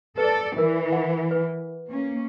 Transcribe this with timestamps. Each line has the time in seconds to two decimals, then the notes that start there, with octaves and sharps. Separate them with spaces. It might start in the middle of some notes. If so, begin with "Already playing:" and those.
0.18 A4 B4 D5
0.58 E3 A#4
0.92 F#5
1.31 B4
1.89 A#3 C#4